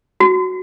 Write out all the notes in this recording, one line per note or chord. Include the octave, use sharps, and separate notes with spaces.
F#4